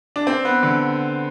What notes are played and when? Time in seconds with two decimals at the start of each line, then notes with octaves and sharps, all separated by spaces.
0.16 D4
0.27 C4
0.45 B3
0.63 D3